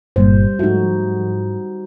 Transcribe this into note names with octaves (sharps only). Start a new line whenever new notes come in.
G1 G2 A#2 G3 C5
G#2 F3 A3 D#4 F#4